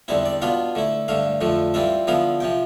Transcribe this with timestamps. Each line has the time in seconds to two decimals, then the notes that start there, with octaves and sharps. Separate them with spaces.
0.08 E2 D3 G3 C4 E4 E5
0.25 D5
0.42 B2 B3 D4 F4 F5
0.75 D3 A3 E4
1.08 G2 D3 A3 F5
1.41 F2 D3 F3 A3
1.74 E3 G3 C4 F4 E5
2.07 D3 F3 B3 E4 F5
2.40 C3 F3 G5